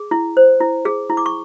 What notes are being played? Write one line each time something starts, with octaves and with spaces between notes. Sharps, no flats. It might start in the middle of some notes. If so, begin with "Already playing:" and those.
Already playing: G#4
E4
C5
E4
G#4
E4
D6
C#6